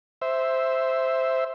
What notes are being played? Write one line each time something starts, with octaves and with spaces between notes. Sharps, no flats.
C5 E5